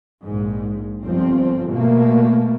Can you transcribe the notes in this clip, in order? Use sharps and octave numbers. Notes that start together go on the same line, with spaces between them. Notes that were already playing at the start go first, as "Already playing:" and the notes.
A#1 G#2
G1 F3 C4
B2 A3 A#3